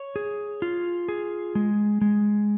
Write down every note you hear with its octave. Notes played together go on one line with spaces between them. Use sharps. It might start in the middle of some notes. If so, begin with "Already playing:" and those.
Already playing: C#5
G#4
F4
G#4
G#3
G#3